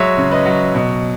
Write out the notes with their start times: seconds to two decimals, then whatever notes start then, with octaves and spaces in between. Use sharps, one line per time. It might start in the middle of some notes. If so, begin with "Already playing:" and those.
Already playing: F#3 G#3 C#5 E5
0.17 C#3
0.31 B4 D#5
0.46 F#3
0.74 B2